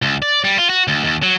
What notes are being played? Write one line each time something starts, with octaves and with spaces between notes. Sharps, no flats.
C#2
D5
G3
F4
F#4
D2
D#2
F#3